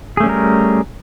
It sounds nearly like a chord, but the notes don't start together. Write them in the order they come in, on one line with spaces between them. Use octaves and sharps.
G#4 A3 C#4 G3 A#4